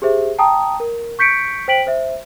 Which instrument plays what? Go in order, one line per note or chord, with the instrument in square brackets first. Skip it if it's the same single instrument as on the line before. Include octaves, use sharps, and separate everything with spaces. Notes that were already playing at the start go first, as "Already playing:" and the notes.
[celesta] G4 G#4 C5 E5
G5 A5 A#5 D#6
A#4
C#6 G6 B6 C#7 D7
C5 G5 B6 D7 F#7
C5 E5